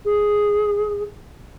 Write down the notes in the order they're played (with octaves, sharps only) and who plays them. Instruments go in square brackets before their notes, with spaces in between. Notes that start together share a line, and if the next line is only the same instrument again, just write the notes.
[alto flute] G#4